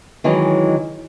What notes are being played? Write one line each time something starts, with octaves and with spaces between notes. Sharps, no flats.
D#3 E3 F#3 G#3 C#4